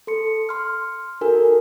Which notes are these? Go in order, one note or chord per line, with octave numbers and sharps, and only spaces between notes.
A4 C6 C#7
C6 F6
D#4 F#4 A4 A#4 G#5